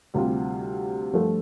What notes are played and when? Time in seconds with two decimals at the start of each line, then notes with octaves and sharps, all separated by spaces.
0.14 D2 C3 G3 F4
1.13 G2 F3 A3 F4 A4